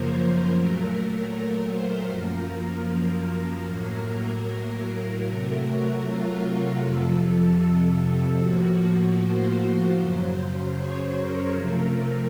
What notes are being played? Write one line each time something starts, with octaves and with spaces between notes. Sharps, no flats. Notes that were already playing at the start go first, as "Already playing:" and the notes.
Already playing: F#2 C#3 F3 A#3 A#4 C5
A#2 F#3 A3
C5
F#2 F3 A#3 A#4
A2 F#3 A#3
C3 F#3 A3 A#4
F#4
F4
F4
F2 C3 F3 A4
A2 F3 A#3 F#4
C5
F#2 C#3 F#3
C#5
A#4
C3 F3 A3